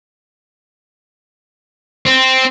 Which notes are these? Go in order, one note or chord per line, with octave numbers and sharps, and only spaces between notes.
C4